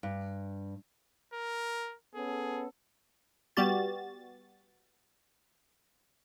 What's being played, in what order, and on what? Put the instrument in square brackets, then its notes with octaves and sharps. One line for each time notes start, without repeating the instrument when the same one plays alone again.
[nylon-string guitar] G2
[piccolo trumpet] A#4
[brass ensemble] B3 C#4 A4 [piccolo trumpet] G#4
[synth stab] G3 B3 F#4 G4 A6